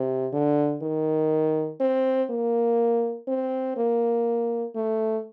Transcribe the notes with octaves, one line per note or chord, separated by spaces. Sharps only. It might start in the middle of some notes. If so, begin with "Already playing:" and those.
Already playing: C3
D3
D#3
C4
A#3
C4
A#3
A3